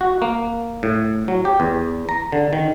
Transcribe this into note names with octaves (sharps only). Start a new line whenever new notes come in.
F#4
A#3
A2
F#3
G4
E2
A#5
D3
D#3